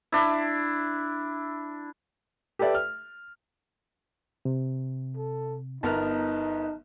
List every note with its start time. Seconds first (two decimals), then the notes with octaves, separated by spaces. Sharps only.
0.12 D4 E4
2.59 G4 A4 B4 D5 E5
2.75 F6
4.45 C3
5.17 A4
5.83 G1 B3 D#4 A#4 A5 F6